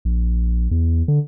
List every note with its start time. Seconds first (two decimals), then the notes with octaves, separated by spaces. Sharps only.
0.05 A#1
0.71 E2
1.08 D3